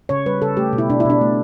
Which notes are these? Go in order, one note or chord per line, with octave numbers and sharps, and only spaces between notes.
C#3 C#5
G3 B4
C#3 A4
A3 G4
B2
E4
B2 D4
E4
B2 D4
A3